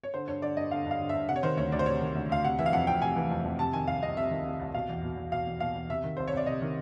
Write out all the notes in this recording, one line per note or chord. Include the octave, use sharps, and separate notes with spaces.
C#5
D3 C5
G2 C#5
D3 D5
G2 D#5
D3 F5
G2
F5
D3
G2 E5
C3 F#5
C#5
D#3 C5
D2 C#5
D2 D5
C5
C3 C#5
D#3
D2
D2 F5
C3 F#5
E3 E5
F5
F2 F#5
F2 G5
C3 G#5
E3
F2
F2
C3 A5
D#3 G#5
C2 F5
C2 D#5
C3 E5
D#3
C2
C2
B2 F5
E2
B2
E2
B2 F5
E2
B2 F5
E2
C3 E5
D#3
C2 C5
C#5
C2 D5
C3 D#5
D#3